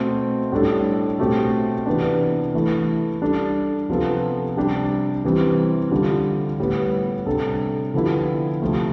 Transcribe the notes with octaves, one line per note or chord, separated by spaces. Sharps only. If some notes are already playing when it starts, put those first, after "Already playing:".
Already playing: B2 A3 C4
A2 G3 D4 A4
B2 A3 C4 G4
C3 E3 B3 D4
E3 A3 E4 A4
G3 D4 A4
C3 F3 B3 F4 A4
C3 G3 D4 G4
C3 E3 G3 C4
D3 G3 D4 F4
A2 G3 B3
C3 G3 D4 A4
D3 F3 B3 E4 G4
C3 F3 A3